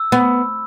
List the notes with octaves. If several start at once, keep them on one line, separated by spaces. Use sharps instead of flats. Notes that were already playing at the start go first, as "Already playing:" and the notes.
Already playing: E6
B3